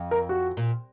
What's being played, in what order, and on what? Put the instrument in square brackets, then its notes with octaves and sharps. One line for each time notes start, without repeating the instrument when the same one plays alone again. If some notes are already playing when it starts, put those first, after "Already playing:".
Already playing: [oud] F2
[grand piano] A#4
F#4
[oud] A#2